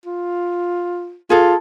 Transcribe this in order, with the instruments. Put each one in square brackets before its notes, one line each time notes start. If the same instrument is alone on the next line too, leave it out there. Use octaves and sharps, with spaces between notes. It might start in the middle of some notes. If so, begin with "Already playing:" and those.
[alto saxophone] F4
[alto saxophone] F4 [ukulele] G#4 A4